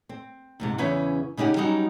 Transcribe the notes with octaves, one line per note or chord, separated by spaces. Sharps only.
C4
D#2 G#2 C3
E2 C#3 C#4 E4 B4 C#5
C#3 C#4 D#4 G4 F#5
F#3 G3 C#4 D#4 F#4